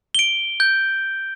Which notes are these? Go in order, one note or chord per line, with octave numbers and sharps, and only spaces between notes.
D7 G7
G6